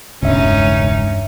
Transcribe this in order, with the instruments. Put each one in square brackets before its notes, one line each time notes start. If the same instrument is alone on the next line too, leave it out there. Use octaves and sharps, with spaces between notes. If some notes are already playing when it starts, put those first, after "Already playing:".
[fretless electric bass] E1 C#2 [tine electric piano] G2 E5 [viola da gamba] C#4 D#4